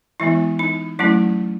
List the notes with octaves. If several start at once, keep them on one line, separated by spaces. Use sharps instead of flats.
E3 G#3 B3 E4
D#4
F#3 A3 C#4 E4